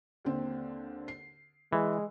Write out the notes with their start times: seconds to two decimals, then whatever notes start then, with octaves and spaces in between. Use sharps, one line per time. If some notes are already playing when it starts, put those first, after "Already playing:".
0.25 D#2 D3 C4
1.08 C7
1.73 E3 G#3